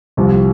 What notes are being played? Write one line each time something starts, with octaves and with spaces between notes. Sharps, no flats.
C2 C3 F3